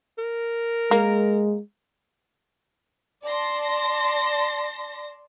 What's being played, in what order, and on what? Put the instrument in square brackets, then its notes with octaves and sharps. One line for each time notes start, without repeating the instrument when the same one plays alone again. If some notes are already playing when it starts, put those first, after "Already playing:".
[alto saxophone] A#4
[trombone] G#3 [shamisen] A#3
[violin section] D5 A5 C6 A#6